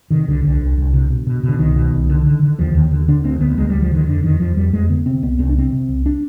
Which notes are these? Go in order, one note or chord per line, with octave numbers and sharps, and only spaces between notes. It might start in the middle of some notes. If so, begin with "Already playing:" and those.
C3 D#3
C2 D3
C2 D3
C2
C2
C3
B2
B2
B2 D3
C2 D#3
B2
C2
D3
D3
D3
D#2 F3
D#2 D#3
D3
D3 D4
D2 C4
D2 B3
D2 G#3
D2 G3
F3
D3 D#3
F2 D3
F2 D#3
F2 F3
F2 G3
F2 G#3
D3 B3
C3 C4
C2 B3
C2 C4
D4
C3 C4
C3
C2
D4